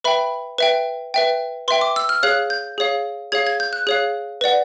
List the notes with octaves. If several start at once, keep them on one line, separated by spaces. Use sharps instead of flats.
B4 E5 G5 B5
B4 E5 G5
B4 E5 G5
B4 E5 G5 C6
D6
E6
F6
G#4 C#5 F5 F#6
G6
G#4 C#5 F5
G#4 C#5 F5 G#6
G#6
G6
F#6
G#4 C#5 F5 F#6
B4 D5 F#5